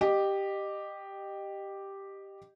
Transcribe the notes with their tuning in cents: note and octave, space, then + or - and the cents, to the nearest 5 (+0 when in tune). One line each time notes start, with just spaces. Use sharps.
G4 +0 D#5 -25